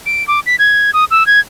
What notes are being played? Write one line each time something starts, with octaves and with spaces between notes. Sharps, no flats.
D7
D6
B6
G#6
D#6
E6
G#6